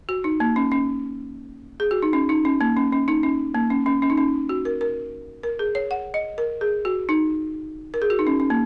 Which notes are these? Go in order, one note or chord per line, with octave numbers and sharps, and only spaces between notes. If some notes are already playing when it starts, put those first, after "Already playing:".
F#4
D#4
A#3
C#4
C#4
G#4
F#4
D#4
C#4
D#4
C#4
A#3
C#4
C#4
D#4
C#4
A#3
C#4
C#4
C#4
D#4
C#4
F#4
A#4
A#4
A#4
G#4
C#5
F#5
D#5
A#4
G#4
F#4
D#4
A#4
G#4
F#4
D#4
C#4
C#4
A#3